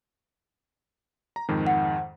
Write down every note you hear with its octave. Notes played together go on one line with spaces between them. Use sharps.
A#5
F2 G#2 D#3
F#5